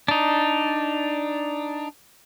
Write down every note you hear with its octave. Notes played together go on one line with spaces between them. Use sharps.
D4 D#4